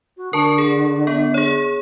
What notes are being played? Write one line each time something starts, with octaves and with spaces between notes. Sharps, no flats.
F#4
D3 A#4 A5 C#6
G#4
B3
G#4 C#5